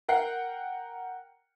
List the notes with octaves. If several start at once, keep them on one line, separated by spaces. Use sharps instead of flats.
A#4 F#5 G5 C7